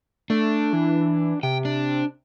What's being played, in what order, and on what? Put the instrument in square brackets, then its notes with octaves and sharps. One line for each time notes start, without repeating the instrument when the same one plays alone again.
[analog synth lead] A3 [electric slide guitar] D4
[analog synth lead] E3
[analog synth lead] C3 [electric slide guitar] G5
[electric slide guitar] D4